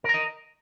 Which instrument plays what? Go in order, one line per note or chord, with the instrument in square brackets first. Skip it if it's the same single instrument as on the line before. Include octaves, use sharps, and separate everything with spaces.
[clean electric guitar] A#4
A#5
D#5